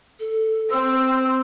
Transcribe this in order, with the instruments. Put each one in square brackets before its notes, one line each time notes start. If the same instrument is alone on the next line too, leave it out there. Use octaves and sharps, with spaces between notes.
[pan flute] A4
[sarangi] C4 [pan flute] E6